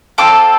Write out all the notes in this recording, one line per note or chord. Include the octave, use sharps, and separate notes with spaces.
C4 F4 A4 D6